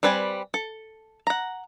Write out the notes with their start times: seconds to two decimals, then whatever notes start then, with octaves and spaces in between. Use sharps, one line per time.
0.03 G3 C4 B4 D5 G#5
0.54 A4
1.27 F#5 A#5